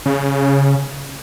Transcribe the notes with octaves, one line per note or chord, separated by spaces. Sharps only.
C#3